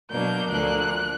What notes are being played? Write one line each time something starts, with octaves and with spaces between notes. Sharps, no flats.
B2 F#3 A#3 D4 G6
D2 D3 F3 A#3 F#6